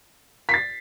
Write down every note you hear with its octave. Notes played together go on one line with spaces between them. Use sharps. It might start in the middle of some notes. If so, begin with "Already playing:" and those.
A6 B6 C7